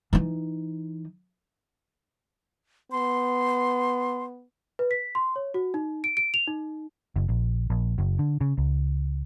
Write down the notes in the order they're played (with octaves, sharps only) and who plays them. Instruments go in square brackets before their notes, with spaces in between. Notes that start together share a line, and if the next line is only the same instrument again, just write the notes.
[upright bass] E3 D#4
[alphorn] B3 [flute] C6
[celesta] B4
B6
C6
C#5
F#4
D#4
D7
D7
F7
D#4
[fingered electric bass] F#1
A#1
A#1
F#1
D3
C#3
C#2